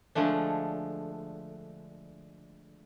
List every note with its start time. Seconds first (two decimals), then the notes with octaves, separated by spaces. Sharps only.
0.15 D3 F3 G#3 A3 D4